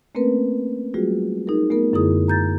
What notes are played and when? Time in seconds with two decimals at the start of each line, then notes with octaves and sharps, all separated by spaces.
0.15 A3 A#3 C4 C#4 A#4 B4
0.94 F#3 G3 A3 F4 F#4 G#4
1.47 D#4 G#4 A#4
1.70 A3 B3 A#4
1.93 F#2 D3 E4 G#4 D#6
2.28 A#5 G6 A6